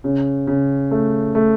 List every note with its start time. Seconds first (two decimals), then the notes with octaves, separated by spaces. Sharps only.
0.04 C#3
0.47 C#3
0.91 A3
1.35 A3